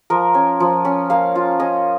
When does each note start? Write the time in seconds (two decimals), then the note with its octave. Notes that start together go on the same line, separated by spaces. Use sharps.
0.10 F3 A#4
0.34 C#4
0.60 F3
0.85 C#4
1.10 A#3 F5
1.35 F4
1.60 C#4 D#5